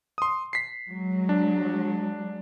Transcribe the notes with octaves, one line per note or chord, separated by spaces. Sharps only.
C6 D#6
B6 C7
F#3 G#3
D4